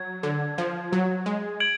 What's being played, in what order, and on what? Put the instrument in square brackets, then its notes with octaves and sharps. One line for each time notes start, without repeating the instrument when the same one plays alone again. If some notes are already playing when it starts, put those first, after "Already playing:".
Already playing: [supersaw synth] F#3 [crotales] G#6
[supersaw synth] D3
F3
F#3
G#3
[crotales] G#6 D7 F#7